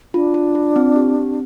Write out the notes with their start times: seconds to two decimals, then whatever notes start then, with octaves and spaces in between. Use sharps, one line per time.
0.14 D4 F4
0.34 F4
0.55 F4
0.76 C4
0.96 G4
1.17 C4